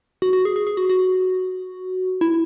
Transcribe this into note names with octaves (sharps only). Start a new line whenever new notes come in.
F#4
F#4
G#4
G#4
G#4
F#4
F#4
E4